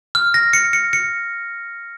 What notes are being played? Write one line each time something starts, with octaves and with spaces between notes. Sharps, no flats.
F6
A#6
C#7
C#7
C#7